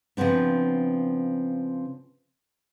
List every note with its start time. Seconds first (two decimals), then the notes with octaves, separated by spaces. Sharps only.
0.17 C#3 F3 B3 C4 D4